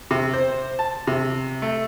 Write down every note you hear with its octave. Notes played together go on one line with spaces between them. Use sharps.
C3
C5
A5
C3
A3